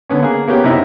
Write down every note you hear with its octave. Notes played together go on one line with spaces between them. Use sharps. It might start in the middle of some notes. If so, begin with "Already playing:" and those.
D3 B3 C#4
A#3 G#4
A#3 B3 C#4 G4
F#2 C3 D#4 E4